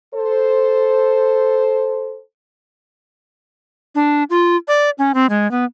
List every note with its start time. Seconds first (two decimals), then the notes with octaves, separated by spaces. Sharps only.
0.14 A4 C5
3.95 D4
4.30 F4
4.68 D5
4.98 C#4
5.14 C4
5.29 G#3
5.51 B3